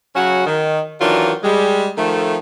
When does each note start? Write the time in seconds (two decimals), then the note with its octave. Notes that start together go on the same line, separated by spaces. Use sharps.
0.15 C#3 F#3 C#4 F#4
0.47 D#3
1.01 D#3 E3 F#3 D4 F4
1.43 G3 G#3
1.98 D#3 F3 A3